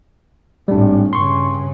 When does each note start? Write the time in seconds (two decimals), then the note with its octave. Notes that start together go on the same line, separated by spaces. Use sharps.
0.68 G#1 A2 G3 D4
1.13 G2 C#3 C6 C#6